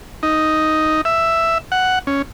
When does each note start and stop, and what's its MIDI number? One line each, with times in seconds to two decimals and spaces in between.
0.23 1.01 63
1.05 1.58 76
1.72 1.99 78
2.07 2.22 61